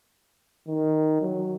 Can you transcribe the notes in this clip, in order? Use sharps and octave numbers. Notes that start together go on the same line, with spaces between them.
D#3
F#3